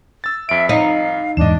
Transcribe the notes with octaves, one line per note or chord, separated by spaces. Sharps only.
E6 A6
F2 E5 D7
D#4 F5
E2 G#2 D4 D#5 E7